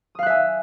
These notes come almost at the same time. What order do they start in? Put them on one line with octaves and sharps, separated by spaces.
D#6 F5 F#6 E5 G#5